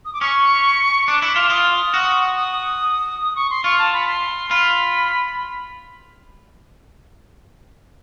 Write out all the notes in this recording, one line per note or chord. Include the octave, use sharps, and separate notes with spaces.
D#6
D6
C#4 C#6
D4 D6
E4
F4
D6
F4 D#6
F#4
D#6
D#6
C#6
C6
F4 C#6
A5
B5
C6
F4 B5